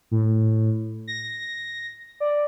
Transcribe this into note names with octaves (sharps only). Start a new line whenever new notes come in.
A2
A#6
D5